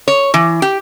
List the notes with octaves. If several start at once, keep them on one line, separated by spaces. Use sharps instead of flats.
C#5
E3
G4